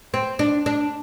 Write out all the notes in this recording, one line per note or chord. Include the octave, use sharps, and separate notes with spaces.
C4
D4
D4